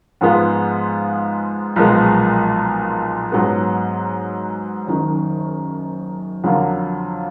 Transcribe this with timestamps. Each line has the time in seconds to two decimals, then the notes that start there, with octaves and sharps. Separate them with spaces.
0.21 G#2 F3 G#3 B3 F4
1.76 B1 A#2 F3 G#3 B3
3.32 G#2 F#3 B3
4.87 F#1 F#2 D#3
6.44 F2 D3 F#3 A#3 F4